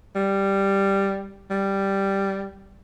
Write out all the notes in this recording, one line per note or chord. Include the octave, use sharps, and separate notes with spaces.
G3
G3